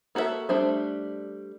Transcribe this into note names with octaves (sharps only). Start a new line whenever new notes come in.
A#3 F#4 A4 C#5 E5
G3 A3 D4 C5 E5